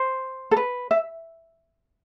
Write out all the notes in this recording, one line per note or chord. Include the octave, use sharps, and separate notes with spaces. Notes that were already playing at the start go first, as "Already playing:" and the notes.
Already playing: C5
A4
B4
E5